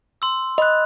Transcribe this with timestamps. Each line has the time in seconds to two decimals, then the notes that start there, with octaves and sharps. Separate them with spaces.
0.22 C6 E6
0.58 D#5 B5 F#6